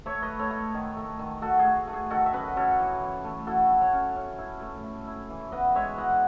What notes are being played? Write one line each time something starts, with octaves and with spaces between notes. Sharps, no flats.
A3 C#5 E5
B4 D#5
A3
A4 C#5
A3
D#3
A3
D#3
A3 F#4 A4
G#4
A3
A3
G#4
D#3 F#4 A4
E5
F#2 B4 D#5
F#2 A4 C#5
E3
E3
A3
E4 F#4 A4
E4
A4 C#5
C#4
C#4
E4
A3
A3
E4
E3
B3 B4 D#5
G#3 C#5 E5
E3 D#5 F#5